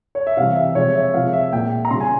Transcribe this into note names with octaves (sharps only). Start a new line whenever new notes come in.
C#5
E5
C3 E3 G3 F5
E5
C3 F3 G#3 C#5
E5
C3 F3 G#3 F5
E5
A#2 G#3 G5
A#5
C#3 G3 C6
G#5